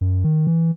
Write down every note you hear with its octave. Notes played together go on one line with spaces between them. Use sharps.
F#2
D#3
E3